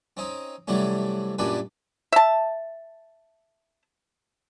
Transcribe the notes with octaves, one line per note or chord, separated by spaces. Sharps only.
C4 C#4 D#4
C3 E3 F#3 G3 A3 C#4
F#2 A#2 G3 D4 B4 G#5
E5 A5